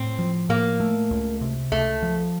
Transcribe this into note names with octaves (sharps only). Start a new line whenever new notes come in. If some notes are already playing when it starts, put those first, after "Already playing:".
Already playing: A2 C4
F3
A2 A#3
A3
C#2
C3
C#2 A3
F3